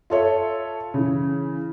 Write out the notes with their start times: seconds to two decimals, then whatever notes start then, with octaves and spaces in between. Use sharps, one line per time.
0.10 F4 A4 C#5 E5
0.94 C#3 E3